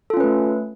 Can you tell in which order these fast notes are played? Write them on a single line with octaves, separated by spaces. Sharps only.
A4 F4 C#4 B4 A3